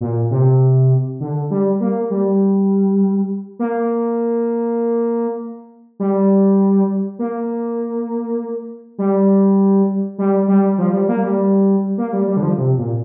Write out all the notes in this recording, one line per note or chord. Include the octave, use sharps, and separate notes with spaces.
A#2
C3
D3
G3
A#3
G3
A#3
G3
A#3
G3
G3
G3
F3
G3
A#3
G3
A#3
G3
G3
D3
F3
C3
A#2